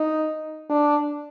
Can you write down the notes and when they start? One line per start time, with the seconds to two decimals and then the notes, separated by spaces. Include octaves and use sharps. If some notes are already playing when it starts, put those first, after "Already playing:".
Already playing: D#4
0.70 D4